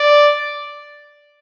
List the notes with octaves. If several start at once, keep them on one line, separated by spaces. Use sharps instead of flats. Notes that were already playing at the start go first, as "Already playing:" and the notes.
Already playing: D5